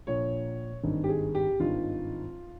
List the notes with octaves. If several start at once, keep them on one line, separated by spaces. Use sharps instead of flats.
A#1 A#2 C#5
G#1 G2 D#3
G4
G#4
G4
G#1 G2 D#3 F4